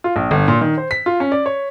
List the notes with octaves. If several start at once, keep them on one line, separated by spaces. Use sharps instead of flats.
F4
A#1
G1
A#2
D#3
C5
B6
F4
C#4
D5
C#5